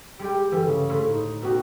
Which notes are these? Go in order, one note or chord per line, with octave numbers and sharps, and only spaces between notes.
G3 G#3 G4 G5
G2 D3 E3 G3
C#3
A2 C5 B5
D#4
B2 D#4 F#4 G4